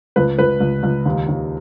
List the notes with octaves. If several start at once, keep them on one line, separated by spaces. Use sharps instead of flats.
C#2 B4
C#2 B4
C#2
C#2
D#2
D#2